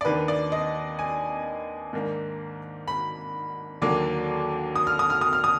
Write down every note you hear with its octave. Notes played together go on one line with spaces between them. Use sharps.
D5
D#2 D#3 A#3 D4 B4
D5
D#5
G#5
G#2 D#3 A#3 D4
B5
D#2 D3 F#3 A#3 D6
D#6
F6
D#6
F6
D#6
F6
D#6